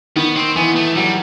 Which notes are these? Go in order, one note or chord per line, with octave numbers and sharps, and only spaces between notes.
D#3 B3
C4
E3 B3
A3
F#3 G3